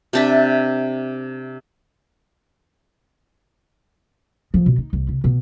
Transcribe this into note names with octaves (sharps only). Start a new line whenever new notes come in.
C3 D4 E5
F3
B2
D#4
C2
C3
B2